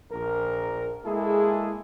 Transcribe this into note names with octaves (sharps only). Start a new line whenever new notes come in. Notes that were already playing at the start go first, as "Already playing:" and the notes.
A#1 A#4
G#3 A#3 E4 G#4 A4